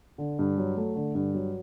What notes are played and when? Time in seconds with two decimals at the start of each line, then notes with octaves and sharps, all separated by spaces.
0.18 D3
0.39 G2
0.58 F#3
0.77 A3
0.96 D3
1.15 G2
1.34 F#3